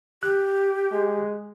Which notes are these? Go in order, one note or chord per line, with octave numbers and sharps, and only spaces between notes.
G4 F#6
G#3